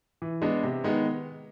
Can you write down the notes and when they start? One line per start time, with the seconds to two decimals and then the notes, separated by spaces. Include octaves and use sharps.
0.22 E3
0.42 G#3 B3 D4
0.63 C3
0.84 D#3 G#3 B3